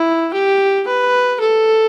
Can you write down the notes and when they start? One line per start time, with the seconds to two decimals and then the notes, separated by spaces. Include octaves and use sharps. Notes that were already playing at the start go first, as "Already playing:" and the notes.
Already playing: E4
0.34 G4
0.87 B4
1.40 A4